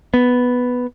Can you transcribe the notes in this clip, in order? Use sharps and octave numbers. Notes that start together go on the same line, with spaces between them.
B3